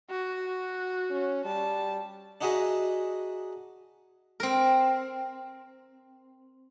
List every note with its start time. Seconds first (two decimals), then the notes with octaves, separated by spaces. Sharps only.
0.11 F#4
1.10 C#4
1.45 G3 A5
2.41 D4 D#4 F#4 G#4 D#5 E5
4.40 C4 A#4